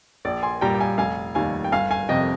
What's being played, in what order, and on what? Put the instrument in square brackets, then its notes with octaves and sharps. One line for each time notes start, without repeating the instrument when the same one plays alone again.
[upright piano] A#1 D5
G#5 C6
A#2 G3 G5 A#5
G5
F5 G#5
F1 F5 G#5
D#2 D#3 G3 F5 G#5
G5
G1 F5 G#5
F5 G#5
F2 C3 D#5 G5